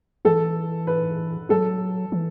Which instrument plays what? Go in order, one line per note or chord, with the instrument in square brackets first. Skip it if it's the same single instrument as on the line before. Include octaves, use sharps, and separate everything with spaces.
[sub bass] E3 [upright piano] A4
[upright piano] B4
[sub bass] F#3 [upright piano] A4
[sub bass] E3